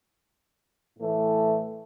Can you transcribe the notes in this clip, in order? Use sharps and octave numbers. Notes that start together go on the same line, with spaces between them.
A2 E3 A3